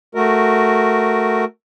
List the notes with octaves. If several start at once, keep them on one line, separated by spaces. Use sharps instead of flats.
A3 F#4 A#4